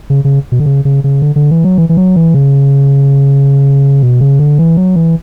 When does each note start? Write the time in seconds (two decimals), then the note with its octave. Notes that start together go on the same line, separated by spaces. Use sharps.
0.10 C#3
0.25 C#3
0.52 B2
0.60 D3
0.66 C#3
0.85 C#3
1.04 C#3
1.22 D3
1.36 D3
1.51 E3
1.64 F#3
1.78 E3
1.89 E3
1.97 F#3
2.16 E3
2.34 C#3
4.03 B2
4.21 C#3
4.39 D3
4.59 E3
4.77 F#3
4.96 E3